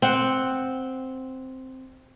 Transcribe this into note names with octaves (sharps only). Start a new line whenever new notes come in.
C4 F#5